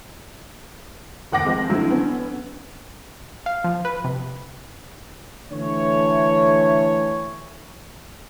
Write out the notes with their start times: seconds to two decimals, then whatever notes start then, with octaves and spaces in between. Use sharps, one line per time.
1.32 F1 D#2 F#5 D6 A#6
1.44 F3 G#3 C4
1.69 D3 F3 F#3 A3 C4 E4
1.89 D3 B3 C#4
3.46 F5
3.64 F3
3.85 B4
4.04 C3
5.51 D3 E3 A3 C#5